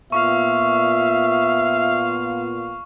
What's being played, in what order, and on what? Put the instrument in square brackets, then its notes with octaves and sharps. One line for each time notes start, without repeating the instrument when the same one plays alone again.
[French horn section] A#2 B3 F4 [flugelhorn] E5 [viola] F5 [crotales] C#6